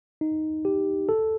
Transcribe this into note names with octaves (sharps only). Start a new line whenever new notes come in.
D#4
G4
A4